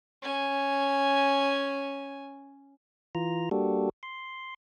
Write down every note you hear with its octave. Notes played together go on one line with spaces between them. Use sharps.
C#4 G#5
E3 F4 A#5
G3 A#3 D4 F#4 G4 A4
C6